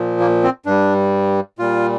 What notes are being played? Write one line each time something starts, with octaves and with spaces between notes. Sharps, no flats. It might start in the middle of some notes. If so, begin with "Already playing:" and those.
Already playing: A#2 F3
A#3
C4
G2 G3 D4
A#2 G3 F4